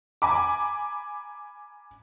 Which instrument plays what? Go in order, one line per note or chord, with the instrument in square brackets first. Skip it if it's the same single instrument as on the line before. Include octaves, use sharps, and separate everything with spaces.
[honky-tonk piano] G#5 A#5 B5 D6